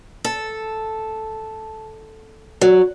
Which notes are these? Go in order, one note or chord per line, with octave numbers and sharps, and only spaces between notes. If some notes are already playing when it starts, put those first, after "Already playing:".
A4
F#3